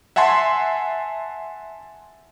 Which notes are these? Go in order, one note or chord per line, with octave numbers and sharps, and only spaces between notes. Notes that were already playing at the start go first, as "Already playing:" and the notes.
E5 F#5 G#5 A5 C6